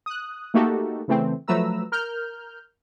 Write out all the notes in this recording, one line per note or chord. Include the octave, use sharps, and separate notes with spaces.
D#6 F#6
A3 A#3 D#4 F#4 G4 A4
C#3 E3 A3 C4
F3 F#3 A3 B4 A#5 E6
A#4 F6 G6